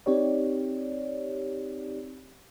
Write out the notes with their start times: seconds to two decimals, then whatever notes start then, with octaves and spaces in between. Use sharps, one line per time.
0.06 C4 D#4 G4 C#5 D5